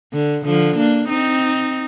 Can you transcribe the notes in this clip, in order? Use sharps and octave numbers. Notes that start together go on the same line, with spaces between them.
D3
D3 F3
A#3 D4
C4 D#4